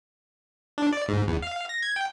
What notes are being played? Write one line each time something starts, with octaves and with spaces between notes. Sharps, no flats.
D4
D5
G#2
E2
F5
A#6
G#6
G5